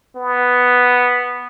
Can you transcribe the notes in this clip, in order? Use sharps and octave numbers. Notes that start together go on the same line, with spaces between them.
B3